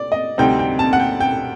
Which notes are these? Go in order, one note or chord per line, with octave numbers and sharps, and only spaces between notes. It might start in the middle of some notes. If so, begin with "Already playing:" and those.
Already playing: D5
D#5
D2 C3 G3 C4 D#4 G5
G5
A5
F#5
G5
G5